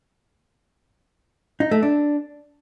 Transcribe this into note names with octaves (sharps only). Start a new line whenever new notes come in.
D#4
A3
D4